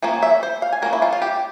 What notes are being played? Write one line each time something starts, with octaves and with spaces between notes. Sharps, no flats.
F3 A#3 C#4 F4
E5
C5
F5
G#5
F3 A#3 C#4 A#4
E4
F4
F4
G4